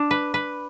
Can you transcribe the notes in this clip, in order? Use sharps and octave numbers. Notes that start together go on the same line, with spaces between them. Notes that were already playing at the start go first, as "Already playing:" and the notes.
Already playing: D4
B4
B4